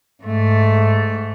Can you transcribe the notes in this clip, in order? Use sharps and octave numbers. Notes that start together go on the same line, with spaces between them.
G#2 A3